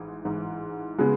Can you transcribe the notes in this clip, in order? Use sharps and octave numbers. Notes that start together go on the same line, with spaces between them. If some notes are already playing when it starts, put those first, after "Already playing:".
Already playing: A1 G#2 E3
A1 G#2 E3
C#3 G#3 B3